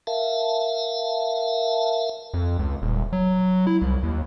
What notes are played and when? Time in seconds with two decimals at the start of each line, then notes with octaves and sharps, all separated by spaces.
0.07 A#4 E5 F5 A5
2.34 F2
2.59 C#2
2.82 D#1
3.13 F#3
3.67 E4
3.82 C2
4.03 D#2